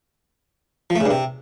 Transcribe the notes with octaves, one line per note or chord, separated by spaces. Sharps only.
F3
A3
C#3
G2
C3